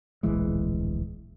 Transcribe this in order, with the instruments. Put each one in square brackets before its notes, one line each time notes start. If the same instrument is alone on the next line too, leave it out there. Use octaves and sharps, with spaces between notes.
[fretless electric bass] D1 A#1 E3 G#3